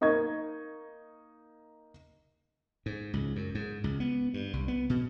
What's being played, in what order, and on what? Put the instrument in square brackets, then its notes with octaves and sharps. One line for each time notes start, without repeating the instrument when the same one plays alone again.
[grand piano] A#3 D#4 D#5 C#6 G#6
[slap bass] G#2
C#2
F#2
G#2
C#2
B3
G2
C2
B3
B2